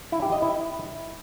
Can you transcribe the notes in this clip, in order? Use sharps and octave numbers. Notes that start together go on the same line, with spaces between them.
E4
G4
D#5
E4